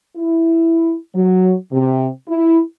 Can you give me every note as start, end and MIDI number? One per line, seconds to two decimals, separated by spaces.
0.16 0.94 64
1.14 1.54 54
1.71 2.07 48
2.27 2.58 64